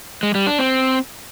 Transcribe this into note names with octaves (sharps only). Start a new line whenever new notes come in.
G#3
G3
D4
C4